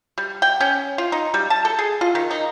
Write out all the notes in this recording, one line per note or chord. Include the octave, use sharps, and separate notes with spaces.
G3
G5
C#4
F4
D#4
G3
A5
A4
G#4
F4
D#3
D#4